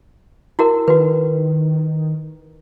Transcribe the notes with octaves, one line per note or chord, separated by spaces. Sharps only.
E4 F#4 A#4
D#3 F#4 B4